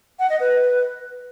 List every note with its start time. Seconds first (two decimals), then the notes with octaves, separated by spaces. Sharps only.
0.19 F#5
0.30 D#5
0.40 B4